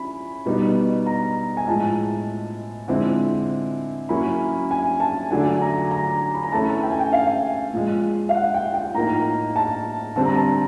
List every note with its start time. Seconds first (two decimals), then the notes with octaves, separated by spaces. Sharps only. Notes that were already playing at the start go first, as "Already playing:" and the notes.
Already playing: F3 C#4 E4 B5
0.46 B2 G3 B3 D#4
1.06 A#5
1.57 G#5
1.67 A2 F3 G#3 A5
2.88 D3 F3 G#3 C4 E4
4.09 F#3 A#3 C#4 E4 B5
4.71 G#5
5.00 A5
5.31 D3 F#3 A3 D4 G#5
5.61 A#5
5.91 A#5
6.34 B5
6.43 A#5
6.52 E3 A3 C#4 A5
6.83 G5
6.91 G#5
7.00 G5
7.13 F5
7.74 A#2 F3 G#3
8.29 F5
8.34 F#5
8.54 G5
8.74 G5
8.95 A2 F3 A#3 D#4 A#5
9.56 A5
10.16 D3 G3 C4 A5
10.25 A#5
10.35 A5